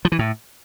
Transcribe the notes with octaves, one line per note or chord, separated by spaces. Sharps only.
F3
E3
A2